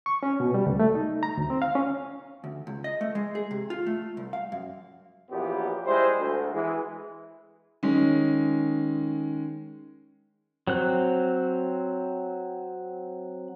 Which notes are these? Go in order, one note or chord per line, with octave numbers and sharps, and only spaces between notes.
C#6
C#4
B2
G3
C#2
A3
D#4
A#5
D2
C4
F5
C#4
D2
C#2
D#5
A3
G#3
G#4
C3
F4
A3
C2
F5
F#2
A#1 A#2 E3 F#3 B3 G4
G3 G#3 E4 C5
D2
E3 G#3
D#3 G#3 C#4
F#3 C4 F#6